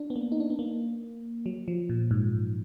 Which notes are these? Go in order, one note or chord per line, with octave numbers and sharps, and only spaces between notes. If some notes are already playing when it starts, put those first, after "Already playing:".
Already playing: D4
B3
A#3
D#4
D4
B3
A#3
F#3
F3
A#2
G#2